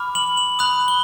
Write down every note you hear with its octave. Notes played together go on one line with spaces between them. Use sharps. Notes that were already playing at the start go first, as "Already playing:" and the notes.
Already playing: B5 D6 F6
F#7
F#7
B5 D#6 F#6 F#7
G7